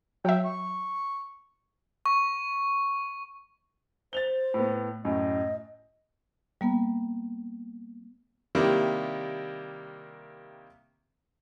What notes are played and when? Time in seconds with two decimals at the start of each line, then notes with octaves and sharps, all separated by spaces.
0.25 F#3 E5 G5
0.45 C#6
2.06 C#6
4.13 C5 A6 F7 G7
4.54 A2 B3
5.05 F#2 A2 D#5
6.61 G3 A#3 B3
8.55 C3 D#3 G3 A#3 E4 G4